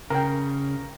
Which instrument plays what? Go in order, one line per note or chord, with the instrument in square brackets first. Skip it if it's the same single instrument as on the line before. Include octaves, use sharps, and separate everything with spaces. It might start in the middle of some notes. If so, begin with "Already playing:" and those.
[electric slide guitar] C#3 [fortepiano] A#4 G5